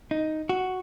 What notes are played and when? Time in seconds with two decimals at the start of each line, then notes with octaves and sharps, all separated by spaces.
0.11 D#4
0.49 F#4